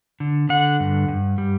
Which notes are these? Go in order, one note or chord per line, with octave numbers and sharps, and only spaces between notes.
D3
D3 F#5
G2
G2
G3